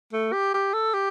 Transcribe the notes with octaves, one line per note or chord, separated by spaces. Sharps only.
A3
G4
G4
A4
G4